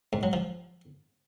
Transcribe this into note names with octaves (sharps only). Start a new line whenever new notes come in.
G#2
F#3
F3